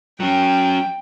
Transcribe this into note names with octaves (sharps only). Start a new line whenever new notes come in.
F#3 C#4 G5